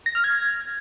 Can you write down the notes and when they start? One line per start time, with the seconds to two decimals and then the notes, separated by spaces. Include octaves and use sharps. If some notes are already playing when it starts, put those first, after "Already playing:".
0.06 A#6
0.15 F6
0.24 G#6